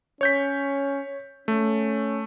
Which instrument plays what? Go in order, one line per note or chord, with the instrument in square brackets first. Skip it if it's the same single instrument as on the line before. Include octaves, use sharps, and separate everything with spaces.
[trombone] C#4 [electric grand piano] C#5 G6 B6
[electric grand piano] A3 [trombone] C#4